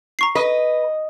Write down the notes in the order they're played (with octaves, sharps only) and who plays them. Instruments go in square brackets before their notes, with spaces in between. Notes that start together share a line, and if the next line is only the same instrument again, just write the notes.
[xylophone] A#5 C#6 C7
[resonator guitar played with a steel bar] B4 [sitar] D#5